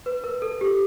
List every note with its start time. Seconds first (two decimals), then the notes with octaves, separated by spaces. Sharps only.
0.06 B4
0.24 A#4
0.42 A4
0.61 G4